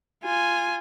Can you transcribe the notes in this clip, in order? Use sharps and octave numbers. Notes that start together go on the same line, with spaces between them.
F4 G#5